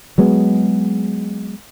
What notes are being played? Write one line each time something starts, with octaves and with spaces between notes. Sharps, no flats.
F#3 G#3 B3